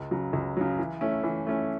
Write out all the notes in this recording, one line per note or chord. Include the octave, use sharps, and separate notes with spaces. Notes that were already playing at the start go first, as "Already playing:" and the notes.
Already playing: C#2
C#3 F#3
C#2
C#3 F#3
E3
A3 C#4 E4
E3
A3 C#4 E4